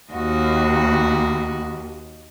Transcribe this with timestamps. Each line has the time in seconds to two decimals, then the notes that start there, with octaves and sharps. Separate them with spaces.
0.13 D#2 F#4 D#5